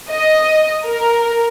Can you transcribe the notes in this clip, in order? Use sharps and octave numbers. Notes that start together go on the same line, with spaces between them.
D#5
A#4